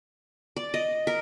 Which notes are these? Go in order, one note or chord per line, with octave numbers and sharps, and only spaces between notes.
D5
D#5
A#4